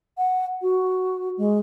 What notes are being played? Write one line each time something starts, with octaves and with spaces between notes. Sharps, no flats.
F#5
F#4
G#3